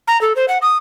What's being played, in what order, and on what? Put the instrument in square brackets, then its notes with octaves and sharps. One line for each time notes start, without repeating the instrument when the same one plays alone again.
[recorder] A#5
A4
C5
F#5
D#6